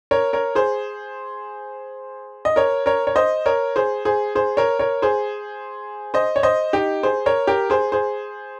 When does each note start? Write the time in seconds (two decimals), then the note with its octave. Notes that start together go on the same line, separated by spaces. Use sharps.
0.11 A#4 C#5
0.33 A#4 C#5
0.55 G#4 C5
2.45 D#5
2.56 A#4 C#5
2.86 A#4 C#5
3.07 C#5
3.16 C5 D#5
3.46 A#4 C#5
3.76 G#4 C5
4.05 G#4 C5
4.35 G#4 C5
4.57 A#4 C#5
4.79 A#4 C#5
5.02 G#4 C5
6.14 C5 D#5
6.36 C#5
6.43 C5 D#5
6.73 D#4 G4
7.03 G#4 C5
7.26 A#4 C#5
7.47 G4 A#4
7.70 G#4 C5
7.92 G#4 C5